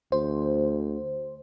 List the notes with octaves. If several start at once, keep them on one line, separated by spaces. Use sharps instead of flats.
D2 C5